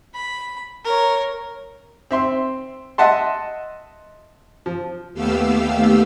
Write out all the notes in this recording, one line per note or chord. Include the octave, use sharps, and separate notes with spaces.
B5
A#4 C#5
C4 E5 C6
D#5 E5 F#5 A5 C6
F3
D#2 A3 B3 G4 F5 E6